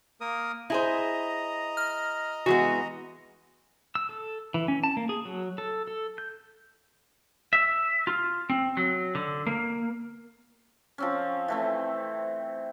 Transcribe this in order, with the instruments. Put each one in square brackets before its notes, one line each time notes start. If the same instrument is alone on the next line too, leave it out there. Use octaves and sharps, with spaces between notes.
[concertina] A#3 A#4 D#6
[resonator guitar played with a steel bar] E4 G#4 C5 [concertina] D#5 A#5
[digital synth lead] F6
[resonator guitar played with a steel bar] E3 G#3 B3 [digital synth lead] F#4
[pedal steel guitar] E6
A4
E3
C#4
A5
A#3
G#4
F#3
A4
A4
G6
[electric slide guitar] E5
F4
C4
F#3
D3
A#3
[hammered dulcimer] F3 C4 C#4
E3 A3 C4